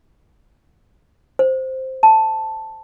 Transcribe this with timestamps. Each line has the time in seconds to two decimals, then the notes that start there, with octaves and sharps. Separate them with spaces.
1.39 C5
2.03 A5